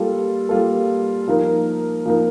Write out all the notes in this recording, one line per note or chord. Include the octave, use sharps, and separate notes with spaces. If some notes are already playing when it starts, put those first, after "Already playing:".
Already playing: G3 A#3 F4 A4
G3 A#3 F4 A4
F3 A#3 D#4 A#4
F3 A#3 D#4 A#4